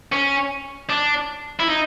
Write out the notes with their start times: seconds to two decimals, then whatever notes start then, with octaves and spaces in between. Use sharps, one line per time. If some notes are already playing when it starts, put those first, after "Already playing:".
0.12 C#4
0.90 D4
1.60 E4
1.68 D#4